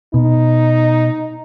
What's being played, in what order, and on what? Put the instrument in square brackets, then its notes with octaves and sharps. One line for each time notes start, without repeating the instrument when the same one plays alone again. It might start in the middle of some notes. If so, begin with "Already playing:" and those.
[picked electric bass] B2 [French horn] D#4